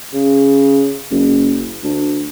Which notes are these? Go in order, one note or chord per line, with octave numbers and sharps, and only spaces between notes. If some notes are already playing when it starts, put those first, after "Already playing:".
C#3
F#1
D2